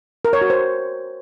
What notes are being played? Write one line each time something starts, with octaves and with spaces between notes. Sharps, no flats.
A#4
C#5
F#4
C5